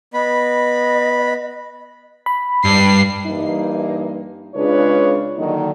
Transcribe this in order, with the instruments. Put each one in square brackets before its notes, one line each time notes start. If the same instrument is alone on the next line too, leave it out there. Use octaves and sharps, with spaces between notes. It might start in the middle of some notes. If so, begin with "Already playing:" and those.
[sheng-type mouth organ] B3 B5 [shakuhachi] D#5
[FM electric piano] B5
[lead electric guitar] G2 [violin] C7
[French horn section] G2 E3 A#3 D#4
C#3 G#3 D4 F4 B4 C#5
D3 D#3 F#3 A#3 D#4